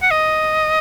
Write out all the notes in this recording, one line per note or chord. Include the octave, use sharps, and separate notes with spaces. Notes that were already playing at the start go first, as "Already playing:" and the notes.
F#5
D#5